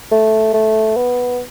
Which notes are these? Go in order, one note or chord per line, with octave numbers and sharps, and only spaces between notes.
A3
A3
B3